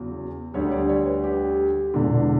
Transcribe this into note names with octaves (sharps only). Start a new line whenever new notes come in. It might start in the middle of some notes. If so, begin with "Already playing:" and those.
Already playing: E2 C#3 F#3
D2 D3 G3 C#5
D5
C#5
B4
G4
E1 E2 D3